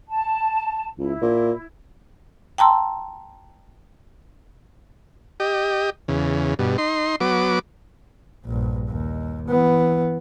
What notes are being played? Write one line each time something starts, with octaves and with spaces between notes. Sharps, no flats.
A5
C#2 E4
A#2
G5 A5 A#5 C6 E6
G4 D#5
E2 C#3
G2 B2
D#4 C6
F#3 B3 D6
A#1 G2
D#2
E3 B3